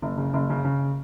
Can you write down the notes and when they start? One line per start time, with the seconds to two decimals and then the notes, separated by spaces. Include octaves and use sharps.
0.02 F#1
0.17 C#3
0.34 F#1
0.50 C#3
0.64 C#3